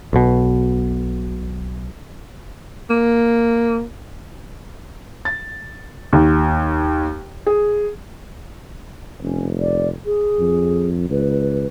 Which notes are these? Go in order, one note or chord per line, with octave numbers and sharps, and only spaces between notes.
B1 B2
A#3
A6
D#2
G#4
F1 C#4
D5
G#4
F2
C#2 B4